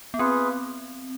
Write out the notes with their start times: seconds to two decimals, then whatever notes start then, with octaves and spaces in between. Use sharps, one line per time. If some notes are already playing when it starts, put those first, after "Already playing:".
0.14 B3
0.18 C4 F4 G#4 B4